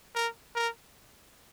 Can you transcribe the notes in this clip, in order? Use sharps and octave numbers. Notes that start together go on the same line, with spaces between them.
A#4
A#4